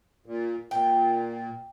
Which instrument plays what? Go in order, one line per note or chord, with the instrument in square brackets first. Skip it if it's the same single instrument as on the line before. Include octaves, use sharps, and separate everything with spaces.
[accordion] A#2
[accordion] A#2 [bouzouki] G5